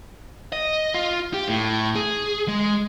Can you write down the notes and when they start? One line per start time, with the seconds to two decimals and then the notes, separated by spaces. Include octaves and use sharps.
0.52 D#5
0.94 F4
1.34 G4
1.49 A2
1.96 G#4
2.48 G#3